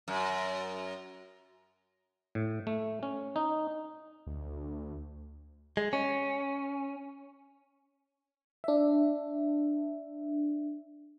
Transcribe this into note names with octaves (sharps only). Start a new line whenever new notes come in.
F#2
A2
A3
C#4
D#4
D2
G#3
C#4
D4 E5